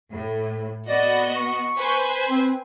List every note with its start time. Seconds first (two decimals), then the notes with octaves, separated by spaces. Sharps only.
0.12 A2
0.89 B3 F#4 D5 D#5
1.36 C#6
1.79 B4 C5 G#5
2.29 C4